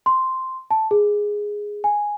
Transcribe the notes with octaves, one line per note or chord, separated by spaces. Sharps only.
C6
A5
G#4
G#5